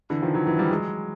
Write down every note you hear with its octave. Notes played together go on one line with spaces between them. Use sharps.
D3 E3
D#3 F3
E3 F#3
E3 F#3
F3 G3
F#3 G#3